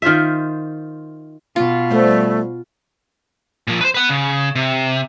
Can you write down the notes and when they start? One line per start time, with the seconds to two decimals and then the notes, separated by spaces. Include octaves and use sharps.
0.02 D#3 F4 C5 E5
1.56 B2 F4
1.90 D#2 G3 A3 C5
3.68 A#2 F3
3.81 B4 C5
3.94 B4 F#5
4.09 C#3
4.55 C3